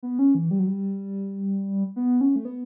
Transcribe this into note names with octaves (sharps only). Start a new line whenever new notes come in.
B3
C#4
E3
G3
F#3
G3
B3
C#4
A3
B3